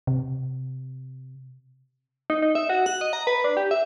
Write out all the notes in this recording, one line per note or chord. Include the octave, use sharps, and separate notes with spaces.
C3
D#4
D#4
E5
F#4
F#6
D#5
A#5
B4
D4
G4
E5